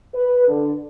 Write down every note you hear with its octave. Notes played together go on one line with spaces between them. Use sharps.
B4
D3